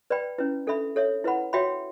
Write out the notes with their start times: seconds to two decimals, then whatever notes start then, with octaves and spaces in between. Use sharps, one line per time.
0.10 B4 D5 G5 B5
0.38 C#4 E4 B4
0.67 D4 A4 E5 B5
0.96 A4 C#5 E5
1.24 E4 B4 F#5 B5
1.53 F#4 C#5 E5 G5 B5